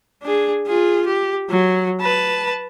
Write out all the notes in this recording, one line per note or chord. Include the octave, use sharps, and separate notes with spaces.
D4 G#4
F4 G#4
G4
F#3
B4 A5